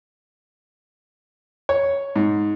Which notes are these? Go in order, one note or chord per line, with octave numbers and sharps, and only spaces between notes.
C#5
G#2